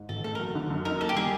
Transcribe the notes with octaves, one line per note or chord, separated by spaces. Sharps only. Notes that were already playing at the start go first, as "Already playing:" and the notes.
Already playing: G#2
A1 A4
A3 A4
A#4
F#3
D3
F#2
D#4 A#4
A#3 A4
G4
G3 G#4